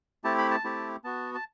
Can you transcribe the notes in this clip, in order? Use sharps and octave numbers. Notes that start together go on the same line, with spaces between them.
A3 C4 E4 G4 A5
B5
A5
A3 C4 E4 G4
B3 F#4 A5
A5